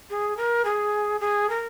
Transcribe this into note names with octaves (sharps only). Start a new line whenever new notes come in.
G#4
A#4
G#4
G#4
A#4